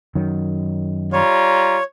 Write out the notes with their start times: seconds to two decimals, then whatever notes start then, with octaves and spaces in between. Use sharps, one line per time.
0.15 F#2 D#3 F#3
1.13 G3 F4 C#5 A#5